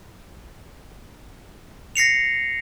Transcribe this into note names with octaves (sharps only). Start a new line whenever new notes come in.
A#6 C7 C#7 F7